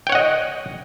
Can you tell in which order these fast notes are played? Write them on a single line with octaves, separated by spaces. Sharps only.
G5 C#5 F#5 D#5